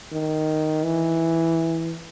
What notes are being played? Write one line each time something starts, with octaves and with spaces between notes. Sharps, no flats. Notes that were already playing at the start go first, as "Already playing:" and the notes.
D#3
E3